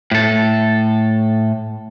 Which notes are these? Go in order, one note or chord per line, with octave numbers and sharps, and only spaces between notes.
A2 A4